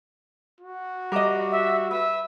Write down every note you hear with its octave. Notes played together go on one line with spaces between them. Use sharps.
F#4
G3 A#4 D#5 D6 E7
E5
B4 E5 E6